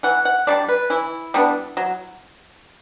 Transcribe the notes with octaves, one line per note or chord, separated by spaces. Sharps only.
E3 F#5
F#5
G3 B3 D4 D5
B4
E3 E4
G3 B3 D4
F#3